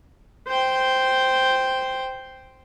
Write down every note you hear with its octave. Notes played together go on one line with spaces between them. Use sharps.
C5 G5